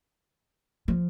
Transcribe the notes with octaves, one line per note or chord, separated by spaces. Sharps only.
F3